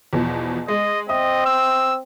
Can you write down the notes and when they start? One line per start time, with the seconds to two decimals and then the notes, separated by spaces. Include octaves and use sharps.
0.13 E2 B2 F3
0.68 G#3 D#5
1.09 C4 D#5 E5 D#6
1.46 E6